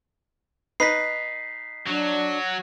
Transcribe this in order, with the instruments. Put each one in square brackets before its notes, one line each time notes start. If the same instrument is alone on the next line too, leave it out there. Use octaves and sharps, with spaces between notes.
[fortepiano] D#4 B4 [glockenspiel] B6 C7
[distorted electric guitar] F#3 [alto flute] D4